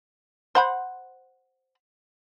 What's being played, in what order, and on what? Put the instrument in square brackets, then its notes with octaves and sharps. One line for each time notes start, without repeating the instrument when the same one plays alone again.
[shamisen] C5 F#5 B5